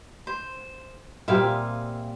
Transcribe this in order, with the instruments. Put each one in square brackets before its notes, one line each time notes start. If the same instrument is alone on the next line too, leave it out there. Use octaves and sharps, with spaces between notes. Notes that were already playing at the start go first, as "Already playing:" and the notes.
[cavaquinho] C5
[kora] A#2 G3 C4 [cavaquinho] E5 F5 G#5